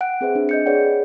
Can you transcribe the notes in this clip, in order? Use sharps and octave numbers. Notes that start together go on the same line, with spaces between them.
F#5 G5 F#6 D7
C4 G#4 B4 C5 E5
D4
D#5 G6 C#7
G#4 B4 C#5 D5 F#5 G5
D5